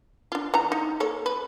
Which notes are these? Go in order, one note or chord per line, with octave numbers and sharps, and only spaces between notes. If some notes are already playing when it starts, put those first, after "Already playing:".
D4 F4
E3 A#5
D#4
A#3 A4 C#5
B4